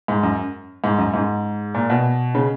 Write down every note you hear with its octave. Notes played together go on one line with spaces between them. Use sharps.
G#2
F#2
G#2
F#2
G#2
A#2
B2
C#3